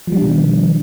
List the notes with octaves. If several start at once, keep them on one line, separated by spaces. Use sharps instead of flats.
B2 D#3 F3 G3 D4